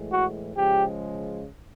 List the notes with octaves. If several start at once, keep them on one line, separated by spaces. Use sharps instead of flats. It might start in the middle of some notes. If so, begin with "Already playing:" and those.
Already playing: A2 E3 G#3
F#4
C#3 F3 G#3 G4